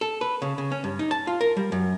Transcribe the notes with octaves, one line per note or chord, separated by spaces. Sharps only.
A4
B4
C#3
C#3
C#4
G2
D#4
A5
F4
A#4
G3
F#2